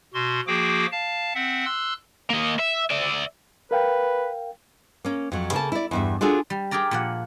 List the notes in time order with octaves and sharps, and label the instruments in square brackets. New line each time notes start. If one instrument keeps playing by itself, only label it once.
[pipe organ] B2 F#4 C6
F3 A#3 F#4 G#4 G5 D6
F5 A5
C4 E5 F#5
C6 E6 F#6
[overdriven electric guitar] A#3 D#5
E5
D5 E5
[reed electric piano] A#4 F5 G5 [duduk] B4
[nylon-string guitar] A#3 C#4
F2 F#3
C#3 A#3 A4 A5
E4 D5
E2 G2 E5
D4 F4 F#4 G#4 A4
[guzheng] G3
G4 G#4 A#4 D5 A#5
A#2 F3 F#5